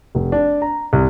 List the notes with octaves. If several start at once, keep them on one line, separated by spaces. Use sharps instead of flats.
F1
D4
A#5
C2